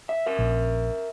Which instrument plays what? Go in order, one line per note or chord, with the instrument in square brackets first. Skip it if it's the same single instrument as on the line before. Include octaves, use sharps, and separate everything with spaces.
[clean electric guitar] E5
A#4 E5
[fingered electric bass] A#1